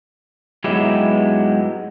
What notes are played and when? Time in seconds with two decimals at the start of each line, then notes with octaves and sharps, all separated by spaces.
0.64 G#2 F#3 G#3 B3 E4 G4